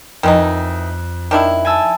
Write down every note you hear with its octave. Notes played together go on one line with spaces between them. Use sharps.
F2 D#3 E3 D#4
D#3 D4 E4
G#5 A5 E6